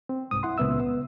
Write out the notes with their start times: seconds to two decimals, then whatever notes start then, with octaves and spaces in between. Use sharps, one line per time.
0.09 C4
0.31 C2 G#2 D#6
0.43 E4 F#5 C6
0.58 C#2 A#2 B3 E5 E6
0.80 B3